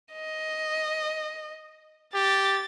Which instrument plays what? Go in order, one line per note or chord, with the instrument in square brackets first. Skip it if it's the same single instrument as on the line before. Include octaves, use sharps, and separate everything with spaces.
[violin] D#5
[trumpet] G4 [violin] A6